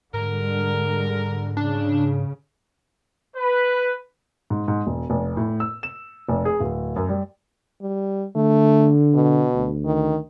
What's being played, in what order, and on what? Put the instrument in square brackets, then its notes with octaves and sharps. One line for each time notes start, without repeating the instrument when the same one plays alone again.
[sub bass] G#2 [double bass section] D3 G3 G#3 [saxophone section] A#4
[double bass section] C#3 [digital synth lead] D4
[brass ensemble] B4
[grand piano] G#2
G#2
E1
F1
A2
E6
E7
F1
G#4
D1
F#2
G3
[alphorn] G3
[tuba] D3 [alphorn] A3
[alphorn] B2
[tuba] D2
[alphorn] D#3